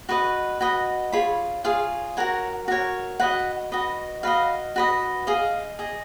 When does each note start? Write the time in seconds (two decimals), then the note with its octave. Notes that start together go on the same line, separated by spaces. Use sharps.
0.09 F#4 B4 D#5 C#6
0.61 F#4 B4 D#5
1.12 F4 G#4 C#5 B5
1.64 F4 G#4 C#5 F5
2.17 F#4 A#4 C#5 F#5
2.68 F#4 A#4 C#5
3.20 F#4 B4 D#5 F#5
3.72 F#4 B4 D#5
4.23 F#4 B4 D#5 F5
4.76 F#4 B4 D#5
5.27 G#4 D#5 F5
5.79 G#4 D#5